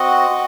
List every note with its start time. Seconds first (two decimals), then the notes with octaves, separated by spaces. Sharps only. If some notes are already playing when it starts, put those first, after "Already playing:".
Already playing: C4 F#4 D#5 F#5
0.30 C4 F#4